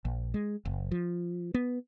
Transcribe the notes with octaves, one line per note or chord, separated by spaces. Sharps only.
A#1
G#3
F#1
F3
B3